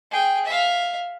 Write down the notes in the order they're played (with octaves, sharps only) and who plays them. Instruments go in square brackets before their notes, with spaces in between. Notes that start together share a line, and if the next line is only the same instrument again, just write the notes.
[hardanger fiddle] G#4 G5
E5 F5